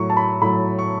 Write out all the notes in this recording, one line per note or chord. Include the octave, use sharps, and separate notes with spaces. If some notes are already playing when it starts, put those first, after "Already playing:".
Already playing: A2 F#3 C#6
A5
B5
A2 F#3 B5
C#6